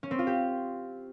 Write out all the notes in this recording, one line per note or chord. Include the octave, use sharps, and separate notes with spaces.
C#4
C4
F4
G4